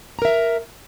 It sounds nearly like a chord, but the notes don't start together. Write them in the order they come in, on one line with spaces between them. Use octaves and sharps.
A#5 A#4 E5